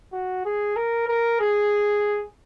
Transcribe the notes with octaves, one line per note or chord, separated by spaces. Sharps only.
F#4
G#4
A#4
A#4
G#4